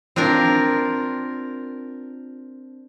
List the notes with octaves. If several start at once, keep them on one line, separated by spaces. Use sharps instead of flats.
C4 D4 F4 A#4